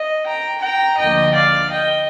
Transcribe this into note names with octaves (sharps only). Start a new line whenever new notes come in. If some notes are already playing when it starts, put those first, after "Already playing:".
Already playing: D#5
G5 A#5
G5 A#5
D2 D3 F3 A#3 D#5 G5
D5 F5
D#5 G5